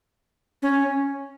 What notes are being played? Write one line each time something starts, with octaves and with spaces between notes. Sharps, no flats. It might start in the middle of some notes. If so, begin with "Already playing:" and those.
C#4